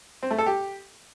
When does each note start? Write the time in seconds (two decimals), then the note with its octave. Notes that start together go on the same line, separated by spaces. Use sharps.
0.23 C4
0.30 A3
0.38 A4
0.46 G4